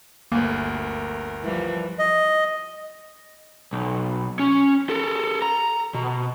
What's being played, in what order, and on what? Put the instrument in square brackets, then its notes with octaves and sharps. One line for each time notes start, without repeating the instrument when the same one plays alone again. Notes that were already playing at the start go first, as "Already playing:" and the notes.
[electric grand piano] G1 D2 [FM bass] A#3 [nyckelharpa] A#4
[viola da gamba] E3 F3 G3
[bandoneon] D#5
[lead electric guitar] B1
C#4
A4 A#4
A#5
B2